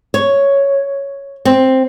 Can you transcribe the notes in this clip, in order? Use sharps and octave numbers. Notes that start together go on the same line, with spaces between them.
C#5
C4